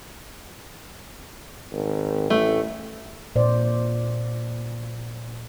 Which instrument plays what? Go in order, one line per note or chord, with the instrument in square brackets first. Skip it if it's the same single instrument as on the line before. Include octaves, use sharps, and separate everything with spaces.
[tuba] G#1
[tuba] A1 [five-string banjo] A3
[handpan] A#2 C5 D5